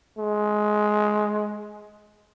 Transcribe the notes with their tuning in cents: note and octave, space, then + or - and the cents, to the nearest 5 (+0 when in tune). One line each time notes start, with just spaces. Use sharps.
G#3 +15